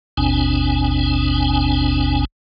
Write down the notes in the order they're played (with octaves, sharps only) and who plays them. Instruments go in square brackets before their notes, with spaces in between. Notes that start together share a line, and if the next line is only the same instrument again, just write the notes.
[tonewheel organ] G#1 D#2 B2 C4 D4 G#5